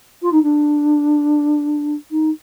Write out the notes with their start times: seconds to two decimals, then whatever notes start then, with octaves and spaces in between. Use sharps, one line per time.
0.22 F4
0.32 D#4
0.43 D4
2.11 D#4